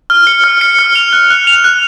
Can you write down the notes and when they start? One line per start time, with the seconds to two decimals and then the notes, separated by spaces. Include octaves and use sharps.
0.10 F6
0.27 C#7
0.44 F6
0.61 C#7
0.79 F6
0.95 F7
1.13 F#6
1.30 F#6
1.47 F7
1.64 F#6